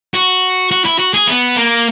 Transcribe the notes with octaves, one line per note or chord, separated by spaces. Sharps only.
F#4
F#4
E4
F#4
G#4
B3
A#3